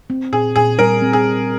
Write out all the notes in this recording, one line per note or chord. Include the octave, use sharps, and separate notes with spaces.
C4
A#2 G#4
A#2 G#4
G3 A#4
C4
G#4
A#2